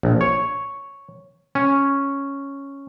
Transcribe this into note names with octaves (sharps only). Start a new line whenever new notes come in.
A#1
C#5
C#4